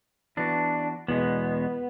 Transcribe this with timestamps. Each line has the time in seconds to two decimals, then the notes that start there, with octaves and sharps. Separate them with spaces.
0.37 E3 B3 D4 F#4
1.08 E2 B2 G#3 B3